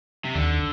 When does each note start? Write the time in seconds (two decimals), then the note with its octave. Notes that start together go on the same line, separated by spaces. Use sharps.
0.25 C3
0.35 D#2 D3